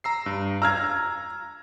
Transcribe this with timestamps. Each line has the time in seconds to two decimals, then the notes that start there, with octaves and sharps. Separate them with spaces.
0.04 A#5 E6 C7
0.26 G2
0.62 A#5 E6 F6 G#6